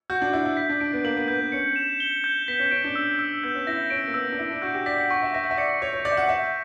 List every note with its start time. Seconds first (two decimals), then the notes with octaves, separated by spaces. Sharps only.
0.10 F#4 G6
0.22 D4
0.33 E4 G6
0.45 E4
0.57 B6
0.69 D4
0.80 D4 D7
0.93 B3
1.05 A#3 F#7
1.17 B3
1.28 B3 G6
1.40 B3
1.52 C#4 C#7
1.76 E7
2.00 G7
2.24 G6
2.48 B3 B6
2.59 C#4
2.71 C#4 D7
2.84 D4
2.95 E6
3.19 E6
3.44 B3 G6
3.55 C#4
3.67 E4 A#6
3.90 C#4 D7
4.08 A#3
4.14 B3 E6
4.32 D4
4.39 E4 E6
4.50 D4
4.62 F#4 G6
4.74 G4
4.86 D5 B6
4.98 F#5
5.10 F#5 C#6
5.22 E5
5.34 E5 A#6
5.43 F#5
5.51 E5
5.58 D5 C#7
5.82 C#5 G6
5.93 C#5
6.05 D5 G6
6.12 E5
6.17 F#5
6.29 E5 B6